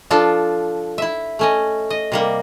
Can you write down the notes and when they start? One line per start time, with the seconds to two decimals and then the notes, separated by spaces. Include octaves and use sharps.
0.11 F3 D4 F4 A4
0.98 E4 E5
1.39 A3 C#4 D#5
1.90 D#5
2.12 C3 G3 A#3